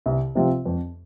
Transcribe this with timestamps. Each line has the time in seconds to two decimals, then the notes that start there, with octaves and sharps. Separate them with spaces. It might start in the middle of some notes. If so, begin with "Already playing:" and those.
0.06 C2
0.35 C3 F3 C4 F4
0.65 F2